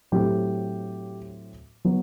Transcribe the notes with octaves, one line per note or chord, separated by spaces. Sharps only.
A2 F#3 A3 C4 G4
F#3 B3